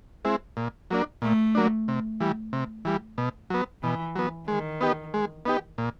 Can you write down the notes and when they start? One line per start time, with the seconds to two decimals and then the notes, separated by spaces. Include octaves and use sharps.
0.25 G#3 C4 E4
0.57 A#2
0.91 F#3 A#3 D4
1.22 A#2 A3
1.55 F#3 A#3 D4
1.88 C3
2.20 E3 G3
2.53 C3
2.85 E3 G3
3.18 B2
3.50 F#3 B3
3.83 B2 E3
4.15 F#3 B3
4.48 D#3 G#3
4.81 B3 D#4 G4
5.14 G#3
5.45 B3 D#4 G4
5.78 A#2